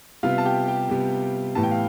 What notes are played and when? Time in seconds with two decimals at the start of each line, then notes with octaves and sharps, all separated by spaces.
0.23 C3 G3 B3 F4 F5
0.38 A5
0.45 G4 G5
0.68 G4 G5
0.89 C3 G3 B3
1.55 A2 E3 G3 B3 A5
1.63 G5
1.71 F5